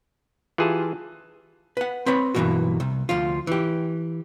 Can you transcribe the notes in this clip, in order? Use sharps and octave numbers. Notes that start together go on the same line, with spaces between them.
E3 F4 G4 G#4 A5
B4 F#5
C4 B4 C#5 B5
B1 G2 B2 E3 A#3 F#4
C2
D2 F3 F4
E3 G4